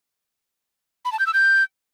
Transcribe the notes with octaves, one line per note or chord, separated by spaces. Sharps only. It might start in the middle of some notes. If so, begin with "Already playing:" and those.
B5
A5
G6
E6
G6